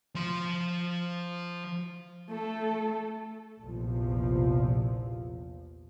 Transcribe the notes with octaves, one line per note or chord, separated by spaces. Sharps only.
F3 C6
A3 A4
A#1 E2 C3 F3